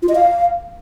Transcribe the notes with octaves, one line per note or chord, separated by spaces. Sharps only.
F4
D#5
F5